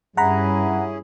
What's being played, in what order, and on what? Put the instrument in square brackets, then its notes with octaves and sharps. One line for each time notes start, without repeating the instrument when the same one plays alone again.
[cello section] G2 [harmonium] C#4 E4 G#4 [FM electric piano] F#5 A#5 B5